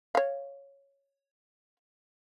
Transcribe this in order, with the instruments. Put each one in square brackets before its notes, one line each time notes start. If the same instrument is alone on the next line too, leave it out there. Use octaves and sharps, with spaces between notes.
[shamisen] C#5 F5